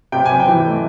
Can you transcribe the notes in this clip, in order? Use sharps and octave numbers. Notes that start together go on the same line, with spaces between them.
C3 G5
C3 G#5
G5
E3
A3